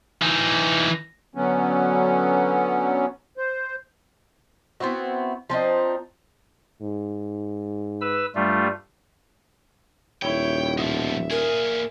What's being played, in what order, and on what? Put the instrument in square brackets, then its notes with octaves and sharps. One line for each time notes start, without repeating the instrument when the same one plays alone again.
[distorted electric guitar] E3 D#4
[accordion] D3 F#3 B3 C#4
C5
[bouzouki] B3 C4 E4 F#4
F3 C4 D4 D#4
[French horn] G#2
[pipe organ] B4 E6
[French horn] G2 [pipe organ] G3 A3 F4
[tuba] D#1 [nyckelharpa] E4 C#5 [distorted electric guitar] G5
[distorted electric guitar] B2 F3 [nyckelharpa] E5
[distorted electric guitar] A#2 G#4 [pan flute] A#4